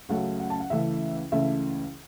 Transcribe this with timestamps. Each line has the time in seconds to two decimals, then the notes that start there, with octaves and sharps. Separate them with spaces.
0.09 C#2 C#3 F#3 A3 F#5
0.40 F#5
0.50 A5
0.60 F#5
0.70 C#2 C#3 E3 A3 E5
1.32 C#2 C#3 E3 A3 E5